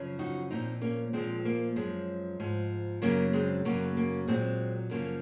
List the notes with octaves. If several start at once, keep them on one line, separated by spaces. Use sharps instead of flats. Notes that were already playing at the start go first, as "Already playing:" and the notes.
Already playing: F#2 C#3 F3
D#4 F#4
A#2 F3 C4 D#4
A#3 C#4
A#2 F3 G#3 C4
A#3
F#2 F3 G#3
G#2 F3
F#2 C#3 F#3 A#3
G#3 C4
F#2 C#3 F#3 A#3
A#3
A#2 F#3 G#3 C4
F#2 C#3 F3 A#3 C#4